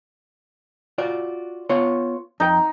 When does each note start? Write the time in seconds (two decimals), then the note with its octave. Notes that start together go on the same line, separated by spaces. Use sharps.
0.98 F4 F#4 D5
1.70 B3 F4 C#5
2.40 F2 D#4 A4 G5